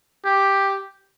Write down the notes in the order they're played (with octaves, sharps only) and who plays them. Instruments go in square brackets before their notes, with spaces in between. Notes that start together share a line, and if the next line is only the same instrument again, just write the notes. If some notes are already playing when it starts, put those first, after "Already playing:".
[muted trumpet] G4